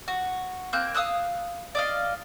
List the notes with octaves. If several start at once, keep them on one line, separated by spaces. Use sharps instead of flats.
F#4
A#3 C4 F#6 G6
F5 D#6 E6 F#6
D5 D#5 F5